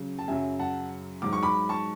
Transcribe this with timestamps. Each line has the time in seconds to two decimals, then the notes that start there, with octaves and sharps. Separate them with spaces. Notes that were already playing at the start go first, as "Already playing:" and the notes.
Already playing: C#3 F#3
0.19 A5
0.28 F#2 C#3 F#3 E5 G#5
0.59 F#5 A5
1.22 G#2 F#3 D6
1.33 C#6
1.43 B5 D6
1.69 A5 C#6